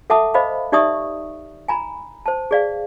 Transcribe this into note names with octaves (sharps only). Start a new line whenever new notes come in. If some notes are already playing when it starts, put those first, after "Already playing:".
A4 E5 F#5 A5 D6 D#6
C5 D#5 F5 B5
D#4 G4 D5 E5 C#6 D#6
G#5 A#5 B5
C5 A5
G#4 D5 F5